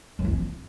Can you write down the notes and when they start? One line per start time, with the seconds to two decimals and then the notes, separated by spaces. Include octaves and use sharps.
0.19 F#2
0.24 E3
0.30 C4